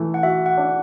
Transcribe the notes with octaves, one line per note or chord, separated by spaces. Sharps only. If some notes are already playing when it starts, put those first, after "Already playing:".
Already playing: E3 A3
F#5
F#4 E5
F#5
D4